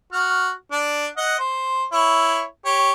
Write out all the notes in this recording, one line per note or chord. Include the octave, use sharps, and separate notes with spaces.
F#4 F6
D4
D#5 F#5
C5
E4 C#5
G4 C#5